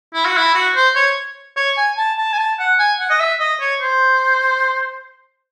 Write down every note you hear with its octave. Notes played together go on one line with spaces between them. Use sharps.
E4
F#4
E4
F#4
C5
C#5
C#5
G#5
A5
A5
G#5
A5
F#5
G#5
F#5
D#5
E5
D#5
C#5
C5